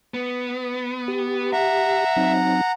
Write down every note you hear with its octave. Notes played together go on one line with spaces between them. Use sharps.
B3
G4
E5 F#5 A#5
F#3 C4 D#4